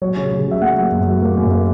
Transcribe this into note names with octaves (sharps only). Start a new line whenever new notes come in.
F#3 C#5
C#3
C#3
F#3 E5
A#3 F#5
F#3
F#2
F#3
A#3
F#2
A#3